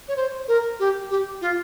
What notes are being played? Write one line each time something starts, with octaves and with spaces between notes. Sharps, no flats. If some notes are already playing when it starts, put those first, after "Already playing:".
C#5
C5
A#4
G4
G4
F4